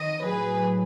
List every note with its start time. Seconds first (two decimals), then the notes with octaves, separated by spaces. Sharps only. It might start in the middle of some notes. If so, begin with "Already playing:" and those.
Already playing: D#3 D#5
0.25 A2 F#3 G#4 B4